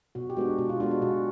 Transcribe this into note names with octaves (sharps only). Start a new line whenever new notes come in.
B2 F#4
G4
G#3 B3 D4 F#4
B2 F#4
F4
G#3 B3 D4 F#4
F#4
B2 F#4